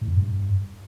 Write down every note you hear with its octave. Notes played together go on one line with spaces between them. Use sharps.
A2
F#2
G2